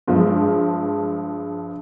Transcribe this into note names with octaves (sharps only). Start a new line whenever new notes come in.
G2 F3 G#3